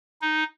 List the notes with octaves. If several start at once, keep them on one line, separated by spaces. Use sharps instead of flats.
D#4